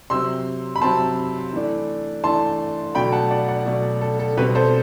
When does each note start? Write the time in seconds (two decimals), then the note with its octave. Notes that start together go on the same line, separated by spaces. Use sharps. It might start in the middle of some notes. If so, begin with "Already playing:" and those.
0.10 C3 F#3 C4 C6 E6
0.76 B5
0.82 C3 F#3 C4 A5 C6
1.53 E3 A3 D4
2.24 E3 A3 D4 A5 C6
2.95 B2 F#3 A3 D4 G5 B5
3.12 F#5 A5
3.31 D5 F#5
3.48 D5 F#5
3.66 B2 F#3 A3 D4
4.01 A4
4.19 A4
4.37 B2 G3 C4 G4 B4
4.55 A4 C5